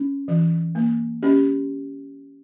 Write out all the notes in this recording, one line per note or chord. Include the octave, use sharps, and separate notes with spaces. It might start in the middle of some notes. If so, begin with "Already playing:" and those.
Already playing: C#4
E3
A#3
C#4 G4